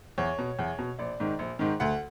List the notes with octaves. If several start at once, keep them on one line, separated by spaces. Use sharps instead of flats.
E2 C#5
B2
E2
B2
A#1 D5
G#2 D#3
A#1
G#2 D#3
D2 F#5